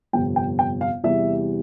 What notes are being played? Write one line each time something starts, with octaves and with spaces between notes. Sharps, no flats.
G1 F2 C3 G5
G5
G5
F5
E2 C3 E3 G3 E5